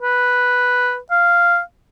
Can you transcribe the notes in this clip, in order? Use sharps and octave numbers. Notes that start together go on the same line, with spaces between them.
B4
F5